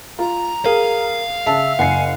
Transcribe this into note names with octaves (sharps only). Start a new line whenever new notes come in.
F4 A#5
G#4 A#4 F5
C#3 E5 A5 E6
F#1 F#5 G#5 C7